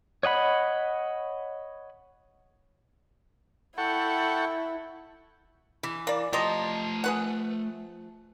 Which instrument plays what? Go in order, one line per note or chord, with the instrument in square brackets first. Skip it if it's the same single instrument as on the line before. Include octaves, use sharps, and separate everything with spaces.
[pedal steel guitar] C#5 D#5 F#5 B5
[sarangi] E4 [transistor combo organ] A4 G5 C#6 [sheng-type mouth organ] F#5
[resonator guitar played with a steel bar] E3
[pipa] A#3 D5
[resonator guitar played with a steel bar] F3 [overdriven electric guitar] A3 A#5 [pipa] G4 D#5
[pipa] G#4 B4 F#5